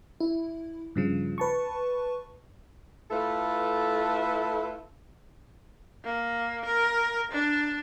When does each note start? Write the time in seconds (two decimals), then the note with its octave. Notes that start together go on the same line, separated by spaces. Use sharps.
0.20 E4
0.96 G2 C#3 F3
1.38 B4 A5 C#6
3.11 A3 E4 F4 A4 B4
6.04 A#3
6.65 A#4
7.31 D4